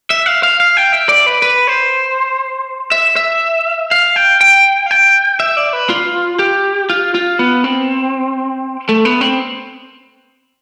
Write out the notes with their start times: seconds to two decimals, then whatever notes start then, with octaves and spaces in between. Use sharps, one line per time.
0.10 E5
0.26 F5
0.43 F5
0.60 F5
0.77 G5
0.93 E5
1.09 D5
1.26 B4
1.42 B4
1.67 C5
2.92 E5
3.16 E5
3.91 F5
4.16 G5
4.41 G5
4.86 F5
4.91 G5
5.40 E5
5.57 D5
5.73 B4
5.90 F4
6.39 G4
6.90 F4
7.15 F4
7.39 B3
7.64 C4
8.89 A3
9.05 B3
9.21 C4